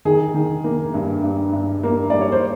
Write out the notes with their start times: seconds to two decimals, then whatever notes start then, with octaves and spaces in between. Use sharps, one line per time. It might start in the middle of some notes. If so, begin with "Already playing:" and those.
0.05 D#3 G#4
0.34 D#3
0.64 A#3
0.94 G2
1.23 G2
1.53 G2
1.83 A#3
2.10 G3 D5
2.21 C#5
2.32 C5